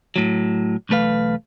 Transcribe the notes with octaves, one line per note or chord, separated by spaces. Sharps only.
A2 F#3
B1 E2 A3 B4 F5